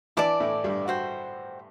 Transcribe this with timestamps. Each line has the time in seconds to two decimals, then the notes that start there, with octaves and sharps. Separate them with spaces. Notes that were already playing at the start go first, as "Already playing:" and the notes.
0.17 E3 E4 D5 A5 D6
0.40 A2 A3
0.64 G2 G3
0.88 F#4 C5 G5